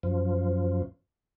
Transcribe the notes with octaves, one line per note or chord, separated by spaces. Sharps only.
F#2 F3